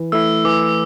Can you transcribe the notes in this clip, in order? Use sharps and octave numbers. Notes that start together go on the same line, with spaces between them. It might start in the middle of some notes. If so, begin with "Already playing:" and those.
Already playing: E3
A3 E4 E6
E3 D6